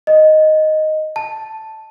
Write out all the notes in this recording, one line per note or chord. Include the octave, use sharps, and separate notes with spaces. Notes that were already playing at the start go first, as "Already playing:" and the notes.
D#5
A5